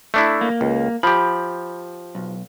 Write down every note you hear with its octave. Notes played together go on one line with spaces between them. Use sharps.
A3 D4 E4
A#3
C#2
F3 G4 B5
B1